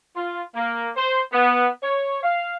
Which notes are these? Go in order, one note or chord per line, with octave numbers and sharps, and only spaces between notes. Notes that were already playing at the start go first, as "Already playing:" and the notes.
F4
A#3
C5
B3
C#5
F5